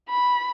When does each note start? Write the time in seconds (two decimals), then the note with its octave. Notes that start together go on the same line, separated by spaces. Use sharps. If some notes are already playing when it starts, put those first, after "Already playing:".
0.09 B5